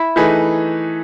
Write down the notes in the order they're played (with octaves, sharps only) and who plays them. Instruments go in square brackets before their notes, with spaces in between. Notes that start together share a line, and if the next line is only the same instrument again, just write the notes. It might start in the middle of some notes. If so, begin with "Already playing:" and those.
Already playing: [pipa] E4
[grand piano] E3 A3 D#4 G#4 B4